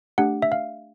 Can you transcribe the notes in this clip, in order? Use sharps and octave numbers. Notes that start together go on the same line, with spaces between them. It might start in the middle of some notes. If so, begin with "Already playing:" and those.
A3 D4 G4 F#5
E5
F5